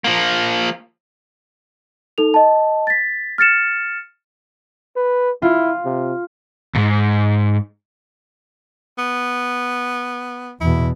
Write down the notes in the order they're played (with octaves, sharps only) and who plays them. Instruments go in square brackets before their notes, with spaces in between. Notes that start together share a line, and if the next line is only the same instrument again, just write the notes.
[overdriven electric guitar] F3 A#3
[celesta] D#4 A4 F7
D#5 A5
A6 B6
F6 A6 C#7 E7
[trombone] B4
[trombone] E4 [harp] F4
[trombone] C3
[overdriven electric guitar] D#2 G#2
[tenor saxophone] B3
[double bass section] E2 B2 [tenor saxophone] E4